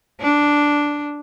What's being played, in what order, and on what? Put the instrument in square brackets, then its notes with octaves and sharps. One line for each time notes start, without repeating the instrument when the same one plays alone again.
[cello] D4